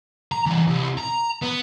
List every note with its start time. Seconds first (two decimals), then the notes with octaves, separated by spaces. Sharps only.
0.32 A#5
0.46 E3 G3
0.67 C2
0.98 A#5
1.42 B3